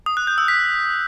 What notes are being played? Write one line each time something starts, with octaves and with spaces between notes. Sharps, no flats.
D#6
F#6
G6
E6
B6